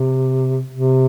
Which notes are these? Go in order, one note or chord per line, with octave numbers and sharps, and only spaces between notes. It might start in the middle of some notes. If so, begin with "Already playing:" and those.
Already playing: C3
C3